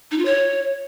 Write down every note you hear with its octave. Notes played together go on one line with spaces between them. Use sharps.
D#4
F4
C#5